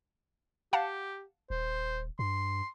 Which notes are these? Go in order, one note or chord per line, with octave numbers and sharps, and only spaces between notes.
G4 F5 F#5 A5
D#1 C5
G2 C6